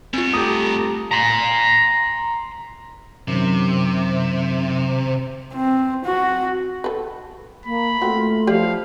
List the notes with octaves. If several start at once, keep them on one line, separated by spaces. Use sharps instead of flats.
G2 B3 C4 F4
A3 G4 A#5 D#6
A#5 C6
F#2 C3 D#3 F#3
C4
F#4
A4 B4
A#3 B5
A3 C4 F4 F#4
F3 G4 C#5 D5 F5